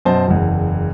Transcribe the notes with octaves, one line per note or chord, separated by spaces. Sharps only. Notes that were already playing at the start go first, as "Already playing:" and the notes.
F#2 B2 C5 A5
F#1 E2